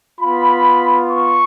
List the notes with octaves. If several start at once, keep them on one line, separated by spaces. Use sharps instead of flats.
B3 F4 B5
C#6